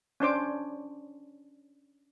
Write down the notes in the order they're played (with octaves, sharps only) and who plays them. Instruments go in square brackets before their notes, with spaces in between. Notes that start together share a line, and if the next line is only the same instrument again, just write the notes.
[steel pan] C#4 D4 C5 D6